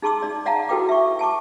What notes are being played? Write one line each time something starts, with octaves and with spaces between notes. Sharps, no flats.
D#4 G#4 A5 C6 D6 E6
D#4 D5
D5 D#5 F5 F#5 A5 A#5
E4 F#4 A4 B4 G5 D6
E5 C#6
G#5 A5 C#6 D6